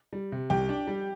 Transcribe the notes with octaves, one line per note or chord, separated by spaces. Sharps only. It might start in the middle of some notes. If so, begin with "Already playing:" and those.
G3
C3
C2 G4
D4
G3